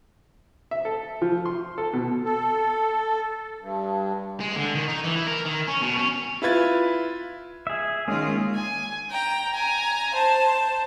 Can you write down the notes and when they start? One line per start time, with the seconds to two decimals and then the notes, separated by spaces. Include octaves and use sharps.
0.71 E5
0.85 A4
1.22 F3
1.46 C6
1.78 A4
1.93 B2
2.25 A4
3.60 G2
4.40 G#3
4.56 D3
4.75 D#3
4.88 D#4
5.04 E3
5.16 E4
5.28 A#4
5.45 D#3
5.68 C#4
5.82 B2
5.97 C#4
6.42 E4 F4 B4 G#6 A6
7.67 G#4 E5
8.08 D#3 G#3 A#3 C#4 F4 G#4
8.55 G#5
9.11 G5 A#5
9.54 G#5 A#5
10.15 C5 A5